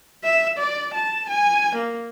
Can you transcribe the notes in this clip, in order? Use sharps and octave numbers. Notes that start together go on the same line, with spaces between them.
E5
D5
A5
G#5
A#3